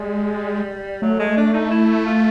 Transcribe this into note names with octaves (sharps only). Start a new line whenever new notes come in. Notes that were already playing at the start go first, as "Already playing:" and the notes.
Already playing: G3 G#3
F#3 A3
G#3
D4
D#4
E4
F4